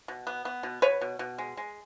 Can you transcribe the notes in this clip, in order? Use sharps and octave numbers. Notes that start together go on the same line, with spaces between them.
B2
B3
B3
B2
B2 B4 C#5
B2
B2
G#3
G#3